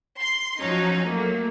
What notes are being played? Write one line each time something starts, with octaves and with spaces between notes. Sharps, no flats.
C6
F3 F#3 C#4 D#4
F#3 A3 A#3